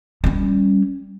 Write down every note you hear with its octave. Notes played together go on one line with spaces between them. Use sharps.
G3 C#4